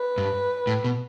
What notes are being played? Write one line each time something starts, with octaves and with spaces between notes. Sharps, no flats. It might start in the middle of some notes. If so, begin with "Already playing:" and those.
Already playing: B4
G2
A2
B2